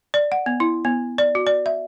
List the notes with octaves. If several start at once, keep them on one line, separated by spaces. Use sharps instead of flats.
D5
F#5
B3
E4
B3
D5
F#4
D5
E5